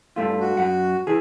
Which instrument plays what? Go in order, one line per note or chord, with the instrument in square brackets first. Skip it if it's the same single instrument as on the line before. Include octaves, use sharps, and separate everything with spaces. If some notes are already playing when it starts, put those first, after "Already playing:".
[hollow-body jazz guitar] G2 A3 F4
[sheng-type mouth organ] F#4
[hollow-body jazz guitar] F#2 F#5
E3 G#4